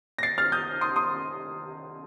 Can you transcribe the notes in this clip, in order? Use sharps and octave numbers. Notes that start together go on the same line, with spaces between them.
A#6
A6 C7
F6 A6
D#6 G6
C6 D#6
C6 D#6